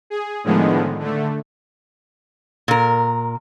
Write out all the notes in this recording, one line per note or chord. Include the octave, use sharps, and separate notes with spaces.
G#4
A2 D3 D#3 F3 G#3 B3
D3 A3
A#2 A#4